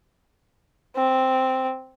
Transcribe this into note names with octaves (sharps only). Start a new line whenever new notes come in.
C4